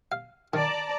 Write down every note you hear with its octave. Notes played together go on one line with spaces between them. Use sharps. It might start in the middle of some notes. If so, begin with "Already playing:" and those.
F5
D#3 D5 A5 A#5